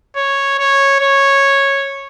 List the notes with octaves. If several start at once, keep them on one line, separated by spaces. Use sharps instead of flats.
C#5
C#5
C#5